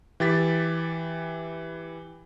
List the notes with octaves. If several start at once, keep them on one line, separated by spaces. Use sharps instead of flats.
E3 G4 A6 B6